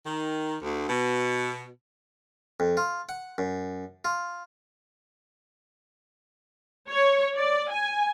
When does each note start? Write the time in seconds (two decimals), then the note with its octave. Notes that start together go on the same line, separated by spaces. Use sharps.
0.04 D#3
0.61 D2
0.88 B2
2.60 F2
2.77 F4
3.09 F#5
3.38 F#2
4.05 F4
6.90 C#5
7.37 D5
7.71 G#5